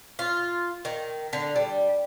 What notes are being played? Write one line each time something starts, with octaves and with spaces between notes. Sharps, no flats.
F4
D#3
D3
G3